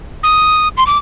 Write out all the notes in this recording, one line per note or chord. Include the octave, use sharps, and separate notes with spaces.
D#6
C6
D6